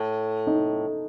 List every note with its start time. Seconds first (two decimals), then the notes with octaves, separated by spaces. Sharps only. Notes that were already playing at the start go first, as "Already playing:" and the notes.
Already playing: A2
0.47 D#4